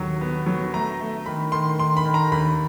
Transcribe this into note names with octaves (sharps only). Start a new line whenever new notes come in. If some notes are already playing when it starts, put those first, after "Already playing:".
Already playing: D#2 F#3
B3
F#3
A3 A#5
A3
D#3 B5
D#3 C6
D#3 C6
B5
D#3
A#5
D#2 B5